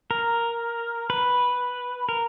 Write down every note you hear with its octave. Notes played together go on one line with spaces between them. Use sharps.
A#4
B4
A#4